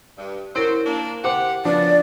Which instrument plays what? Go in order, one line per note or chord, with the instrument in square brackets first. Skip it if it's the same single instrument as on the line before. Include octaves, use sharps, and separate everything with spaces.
[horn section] G2
[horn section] F#3 C#4 C5 [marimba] E4 A#4 [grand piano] D7
[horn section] A#3 D4
[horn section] G4 F#5 [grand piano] C5 D6
[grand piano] F3 D4 [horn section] B3 C#4 [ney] D5